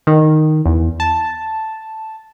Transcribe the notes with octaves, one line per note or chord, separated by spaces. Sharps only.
D#3
E2
A5